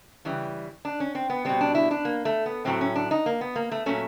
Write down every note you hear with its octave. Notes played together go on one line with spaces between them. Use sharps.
C#3 E3 G3
D4
C#4
C4
B3
B2 G3 C4
D4
E4
D4
A#3
A3
B3
A2 F#3 A3 C4
C#4
D4
D#4
A#3
B3
A#3
A3
A#2 F#3 A3 C#4